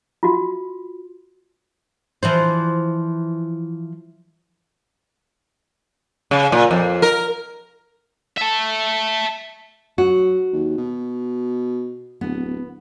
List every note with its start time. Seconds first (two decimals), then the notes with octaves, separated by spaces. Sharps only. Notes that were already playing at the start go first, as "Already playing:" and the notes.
0.23 F4 F#4
2.23 E3 F3 C5
6.31 C#3
6.52 A#2
6.71 F2
7.02 A#4
8.38 E5 A5
9.98 F#3 F#4
10.53 D#2
10.77 B2
12.21 D1 B3